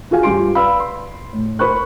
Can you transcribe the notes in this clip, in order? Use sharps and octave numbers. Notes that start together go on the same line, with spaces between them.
F4 F#4 G#4 F5 G#5
G2 C#4 F4 G4 C6 D7
B4 D5 F5 B5 E6
C6
A2
A#4 C5 B5 C#6 F#6